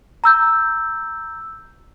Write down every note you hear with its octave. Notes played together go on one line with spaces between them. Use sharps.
A#5 E6 G6